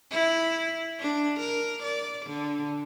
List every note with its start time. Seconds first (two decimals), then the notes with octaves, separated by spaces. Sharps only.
0.11 E4
1.00 D4
1.39 A#4
1.83 D5
2.26 D3